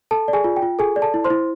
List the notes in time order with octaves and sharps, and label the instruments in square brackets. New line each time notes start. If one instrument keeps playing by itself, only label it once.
[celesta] A4 A5
D5
G#4 G#5
F4
G5
F4
G#4 A4 G#5
D5
A4 A5
E4
C5 C6
E4